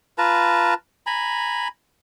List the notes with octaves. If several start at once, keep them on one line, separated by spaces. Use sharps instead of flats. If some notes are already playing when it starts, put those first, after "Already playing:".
F4 B4 A5 A#5
G#5 A#5 B5